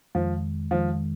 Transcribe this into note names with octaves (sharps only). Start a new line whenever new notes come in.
F2 D#3 F3 G#3
F2 D#3 F3 G#3